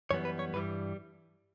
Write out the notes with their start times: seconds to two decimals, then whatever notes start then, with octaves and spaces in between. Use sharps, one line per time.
0.11 F#2 E3 G3 B3 C#5
0.25 B4
0.39 C#5
0.53 G2 E3 G3 B4